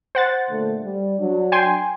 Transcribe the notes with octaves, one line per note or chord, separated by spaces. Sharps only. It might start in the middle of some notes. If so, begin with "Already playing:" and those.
C5 F#5 A6
A#2 D3 A3
G3
F#3 D4
G5 G#5 C6